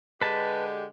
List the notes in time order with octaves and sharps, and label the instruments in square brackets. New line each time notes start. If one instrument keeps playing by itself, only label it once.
[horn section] D3 G#3 G4 [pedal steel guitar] B4 A5